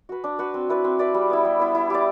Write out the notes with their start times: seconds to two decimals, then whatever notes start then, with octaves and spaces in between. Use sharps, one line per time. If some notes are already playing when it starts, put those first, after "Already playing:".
0.09 F#4 B4
0.24 D4
0.39 F#4 B4
0.54 C4
0.69 E4 B4 D5
0.84 C4
0.99 E4 B4 D5
1.14 G3
1.30 B3 E4
1.45 G3
1.59 B3 E4
1.75 E4
1.90 G4 D5